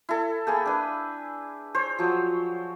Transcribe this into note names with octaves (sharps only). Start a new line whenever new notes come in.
E4 A4
A#3 G#4 G5
D4 B4
C5 C#5
F3 F#3